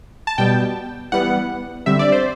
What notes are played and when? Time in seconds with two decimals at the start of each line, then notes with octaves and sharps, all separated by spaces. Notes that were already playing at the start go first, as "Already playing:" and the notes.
0.27 A5
0.38 B2 G3 B3 G5
1.12 E3 G3 B3 F#5
1.86 D3 G3 C4 E5
1.99 D5
2.12 C5